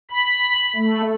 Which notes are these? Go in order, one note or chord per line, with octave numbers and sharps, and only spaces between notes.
B5
A3